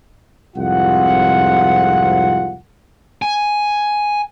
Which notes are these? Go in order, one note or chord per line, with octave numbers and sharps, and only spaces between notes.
C2 F2 G#2 F4 F#5
G#5